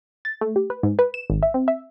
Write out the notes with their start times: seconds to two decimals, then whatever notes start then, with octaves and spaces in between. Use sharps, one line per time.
0.25 A6
0.41 A3
0.56 G4
0.70 B4
0.83 G#2
0.99 B4
1.14 E7
1.30 G#1
1.43 E5
1.54 C4
1.68 E5